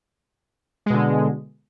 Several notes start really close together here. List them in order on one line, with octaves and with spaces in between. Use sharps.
G#3 B2 D3